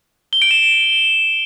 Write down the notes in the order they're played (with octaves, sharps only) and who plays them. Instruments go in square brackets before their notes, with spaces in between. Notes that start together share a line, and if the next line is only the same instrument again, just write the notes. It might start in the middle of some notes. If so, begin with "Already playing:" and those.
[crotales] G7
D7
E7